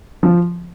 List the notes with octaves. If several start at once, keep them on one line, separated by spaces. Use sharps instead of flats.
F3